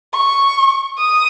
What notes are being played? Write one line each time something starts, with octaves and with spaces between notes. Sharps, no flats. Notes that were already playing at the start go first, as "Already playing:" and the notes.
C#6
D#6